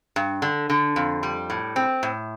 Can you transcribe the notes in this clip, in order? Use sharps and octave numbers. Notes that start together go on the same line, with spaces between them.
G2
D3
D3
F2
G3
A2
C4
A2